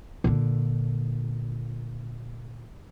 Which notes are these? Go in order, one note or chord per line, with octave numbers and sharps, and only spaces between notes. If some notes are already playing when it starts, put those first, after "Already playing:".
A#2 D3